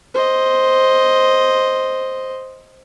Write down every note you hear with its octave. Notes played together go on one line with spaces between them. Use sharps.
C5 D#5